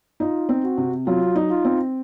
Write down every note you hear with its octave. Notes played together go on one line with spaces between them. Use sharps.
D#4 F4
C4
F#4
C3
F#3 F4
D#4
F4
C4